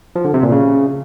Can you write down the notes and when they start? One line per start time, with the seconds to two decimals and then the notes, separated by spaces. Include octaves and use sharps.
0.16 F3
0.25 D3
0.34 C3
0.43 A#2
0.52 C#3